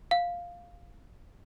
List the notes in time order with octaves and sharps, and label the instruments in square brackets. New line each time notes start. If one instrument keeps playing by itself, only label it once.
[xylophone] F5